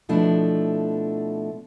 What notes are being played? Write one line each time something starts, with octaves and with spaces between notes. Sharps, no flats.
B2 F3 A3 D4 E4